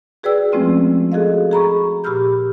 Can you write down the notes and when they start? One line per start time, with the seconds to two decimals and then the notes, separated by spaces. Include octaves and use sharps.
0.23 F#4 G#4 B4 D5 G5 E6
0.52 F3 G#3 A3 C4 C#4 F4
1.12 F#4 G#4 A4 D#5 F5
1.51 G#4 A#5 B5 C#6
2.04 A#2 G4 B5 E6 F6 G6